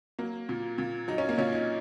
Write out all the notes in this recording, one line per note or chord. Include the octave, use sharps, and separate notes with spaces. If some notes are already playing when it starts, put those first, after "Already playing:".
F#3 A#3
A#2
A#2
F#3 D#4
C#4
A#3
A#2 C#4
D#4